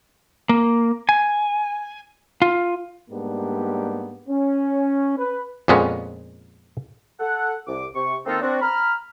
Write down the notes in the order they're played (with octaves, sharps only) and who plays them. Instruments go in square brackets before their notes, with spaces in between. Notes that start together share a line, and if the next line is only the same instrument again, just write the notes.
[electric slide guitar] A#3
G#5
F4
[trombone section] G#2 G3 A#3 B3 D4 G4
C#4
B4
[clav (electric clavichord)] F2 A#2 G#3 B3 C#4
[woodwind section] A4 F#5
C2 D6
C3 C#6
D#3 A#3 C4 D#4 F4 A4
C4 D4 F#4
A#5 B5 F6